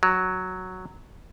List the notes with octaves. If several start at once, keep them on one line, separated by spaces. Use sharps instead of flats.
F#3